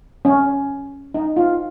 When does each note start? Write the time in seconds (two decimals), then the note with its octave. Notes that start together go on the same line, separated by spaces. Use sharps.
0.25 C#4
1.14 D#4
1.37 F4